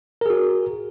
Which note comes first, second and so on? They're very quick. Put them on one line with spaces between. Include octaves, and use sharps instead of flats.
A#4 G#4 F#4